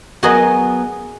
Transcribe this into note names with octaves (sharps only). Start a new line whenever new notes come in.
F#3 B3 F#4 G#4 A#4 D#5